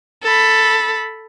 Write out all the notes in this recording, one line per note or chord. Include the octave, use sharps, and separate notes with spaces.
A4 B5